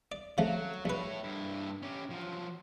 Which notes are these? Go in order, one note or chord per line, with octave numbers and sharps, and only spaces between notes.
D5
C#3 F3 F#3 A3
A#1 A3 B4 C#5
G2 E4
C#4 G4
F3 F#3